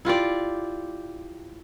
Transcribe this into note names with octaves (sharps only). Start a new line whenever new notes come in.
E4 F4 G4 D5